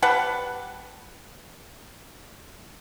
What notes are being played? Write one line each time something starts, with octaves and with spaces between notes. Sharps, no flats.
G3 B4 F#5 A5